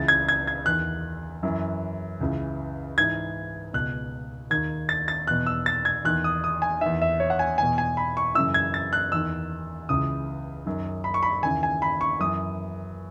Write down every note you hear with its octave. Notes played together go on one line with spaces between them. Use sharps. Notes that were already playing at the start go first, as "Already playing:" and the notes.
Already playing: C#2 C#3 E3 A6
G#6
G#6
G#6
E2 D#3 F#6
F#2 E3
C#2 C#3 E3
G#2 E3 G#6
C#2 B2 F#6
D#2 D#3 G#6
A6
A6
E2 B2 F#6
E6
A6
G#6
E2 D#3 F#6
D#6
D#6
G#5
E2 D#3 E5
E5
C#5
F#5
G#5
E2 B2 G#5
G#5
B5
C#6
F#2 C#3 E3 E6
G#6
A6
F#6
E2 D#3 E6
C#2 C#3 E3 D#6
F#2 D#3
B5
C#6
B5
D#2 C#3 E3 G#5
G#5
B5
C#6
F#2 E3 D#6